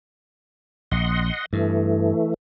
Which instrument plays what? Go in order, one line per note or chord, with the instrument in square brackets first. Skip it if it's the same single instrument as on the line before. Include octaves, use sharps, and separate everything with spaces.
[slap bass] A#1 [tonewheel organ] D#5 F#5 C6
[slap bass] G2 [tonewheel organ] E3 A3